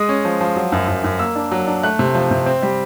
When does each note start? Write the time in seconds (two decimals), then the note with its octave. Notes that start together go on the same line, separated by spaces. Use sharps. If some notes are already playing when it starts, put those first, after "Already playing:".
Already playing: G#3 D#6
0.09 C#4
0.25 F3
0.41 F3
0.56 F#3
0.72 F#2
0.88 F#2
1.04 F#2
1.19 A#3 E6
1.36 D4
1.51 F#3
1.67 D4
1.83 A3 F#6
1.99 C3
2.15 F3
2.31 C3
2.46 C4
2.62 G3